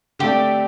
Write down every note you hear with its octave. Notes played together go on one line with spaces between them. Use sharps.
D3 A3 C4 G4 A4 D5